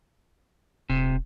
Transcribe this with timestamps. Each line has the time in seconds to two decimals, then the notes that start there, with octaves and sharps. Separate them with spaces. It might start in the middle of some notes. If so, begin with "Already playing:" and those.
0.90 D#1 C3